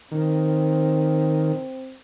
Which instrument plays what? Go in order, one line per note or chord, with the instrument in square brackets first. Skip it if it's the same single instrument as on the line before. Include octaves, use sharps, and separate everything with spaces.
[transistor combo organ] D#3 [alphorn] C4